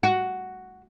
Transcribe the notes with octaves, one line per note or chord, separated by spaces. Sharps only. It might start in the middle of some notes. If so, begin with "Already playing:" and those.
F#4